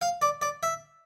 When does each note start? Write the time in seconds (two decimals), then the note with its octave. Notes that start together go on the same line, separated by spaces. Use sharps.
0.01 F5
0.22 D5
0.42 D5
0.63 E5